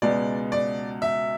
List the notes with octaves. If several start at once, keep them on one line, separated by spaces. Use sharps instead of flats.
C#2 B2 G#3 B3 D5
D5
E5